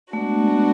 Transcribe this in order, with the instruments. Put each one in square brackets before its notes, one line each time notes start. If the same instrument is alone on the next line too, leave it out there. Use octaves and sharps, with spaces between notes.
[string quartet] G#3 B3 D4 F#4 [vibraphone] A3
[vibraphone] A3